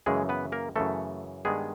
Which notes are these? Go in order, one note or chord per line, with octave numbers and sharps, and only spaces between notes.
F#2 C#3 E3 G#3 G#4
B3 B4
A#3 A#4
F#2 C#3 E3 A3 A4
G2 D#3 G#3 B3 G#4